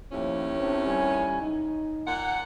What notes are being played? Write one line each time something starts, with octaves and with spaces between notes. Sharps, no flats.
D#2 A2 F3 A#3 C#4
C4 D4
G3 G#5
D#4
A#2 F#5